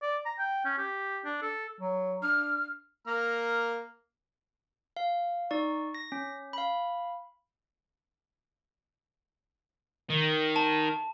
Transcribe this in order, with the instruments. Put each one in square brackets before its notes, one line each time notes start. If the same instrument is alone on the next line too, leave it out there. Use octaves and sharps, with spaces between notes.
[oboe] D5
A#5
G5
C#4
G4
D4
A4
[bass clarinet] F#3
[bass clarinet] D4 [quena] F6
[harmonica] A#3 A#5 F6
[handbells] F5
D#4 D5 C#6
A#6
C#4
F5 B5
[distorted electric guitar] D#3
[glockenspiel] A5